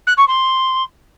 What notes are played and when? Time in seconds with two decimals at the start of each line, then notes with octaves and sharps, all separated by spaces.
0.07 F#6
0.17 C#6
0.28 C6